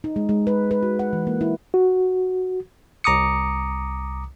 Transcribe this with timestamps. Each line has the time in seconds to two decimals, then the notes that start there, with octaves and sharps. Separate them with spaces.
0.04 D#4
0.16 G#3
0.29 G#3
0.47 B4
0.71 B4
0.83 F#4
0.99 F#5
1.13 E3
1.27 A#3
1.41 E4
1.74 F#4
3.04 C2 A#5 D6 D#6 C#7